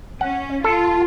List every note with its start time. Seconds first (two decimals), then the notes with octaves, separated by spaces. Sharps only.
0.21 C#4 F#5
0.64 F4 A4